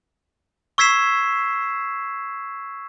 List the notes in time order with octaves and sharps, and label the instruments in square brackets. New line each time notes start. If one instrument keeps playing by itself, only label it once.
[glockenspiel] C#6 E6 G#6 B6 C7 E7